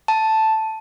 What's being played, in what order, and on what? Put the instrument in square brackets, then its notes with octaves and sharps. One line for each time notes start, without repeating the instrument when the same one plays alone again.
[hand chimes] A5